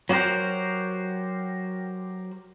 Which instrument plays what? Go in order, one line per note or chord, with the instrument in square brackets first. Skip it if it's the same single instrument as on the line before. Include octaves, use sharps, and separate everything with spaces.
[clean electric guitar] F#3 F#4 G4 A#4 C5